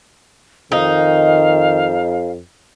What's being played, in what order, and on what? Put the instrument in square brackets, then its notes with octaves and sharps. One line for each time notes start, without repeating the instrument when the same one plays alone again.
[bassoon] F2 [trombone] D#3 [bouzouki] D#4 [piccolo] F5